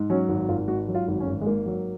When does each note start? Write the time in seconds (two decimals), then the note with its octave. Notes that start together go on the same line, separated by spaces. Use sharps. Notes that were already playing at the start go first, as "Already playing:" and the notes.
Already playing: G#2
0.10 F#3 C#4
0.29 G#1
0.48 G#1 F4
0.68 G#2 F#4
0.88 F#3
0.95 F4
1.08 G#1
1.20 C#4
1.27 G#1
1.41 G#3
1.46 G#2 A#3
1.66 F#3